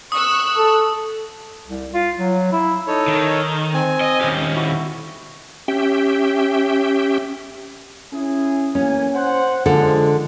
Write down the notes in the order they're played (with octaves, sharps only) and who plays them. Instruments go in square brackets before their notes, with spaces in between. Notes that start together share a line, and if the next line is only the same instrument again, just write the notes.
[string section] C#6 E6 F#6 [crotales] D#6
[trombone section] A4
[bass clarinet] C2
F4
F#3
E4
[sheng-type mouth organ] D#4 A4 C#5
[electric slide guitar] D#3
[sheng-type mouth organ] C4 G#5
[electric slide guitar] D#5
D#3 C#4 G4
[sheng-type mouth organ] E4 F#4
[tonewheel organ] C#4 G4 E5 G5
[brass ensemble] C#4 E4 G#4
[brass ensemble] A1 A#3 G#5 [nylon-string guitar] C#4
[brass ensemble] C5 F#5
[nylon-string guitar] D3 A4 [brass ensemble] F3 G#3 F4